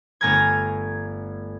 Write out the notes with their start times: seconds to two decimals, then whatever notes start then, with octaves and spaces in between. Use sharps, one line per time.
0.21 G1 A3 G#5 A#5 F6 G#6